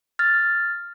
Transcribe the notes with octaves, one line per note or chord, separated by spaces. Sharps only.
F6 A6